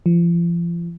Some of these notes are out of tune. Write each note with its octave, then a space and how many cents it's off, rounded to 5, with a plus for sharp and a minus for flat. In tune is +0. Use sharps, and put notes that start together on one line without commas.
F3 -35